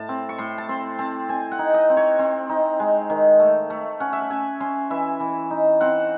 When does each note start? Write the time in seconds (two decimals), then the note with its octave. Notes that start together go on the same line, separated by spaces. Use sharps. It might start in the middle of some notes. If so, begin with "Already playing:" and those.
Already playing: A2 A5
0.09 C4
0.29 C#6
0.38 A2 C6
0.58 A5
0.69 C4 C6
0.99 C4 A5
1.29 C4 G#5
1.52 F#5
1.59 D#4
1.74 D#5
1.89 C4
1.97 C#5
2.19 C4
2.49 D#4
2.80 G#3
3.10 D#3
3.40 A3
3.70 A3
4.00 C#4 F#5
4.13 E5
4.22 F#5
4.30 C#4 G#5
4.60 C#4 C6
4.90 E3 E5
5.20 E3
5.51 D#4
5.80 C4 F#5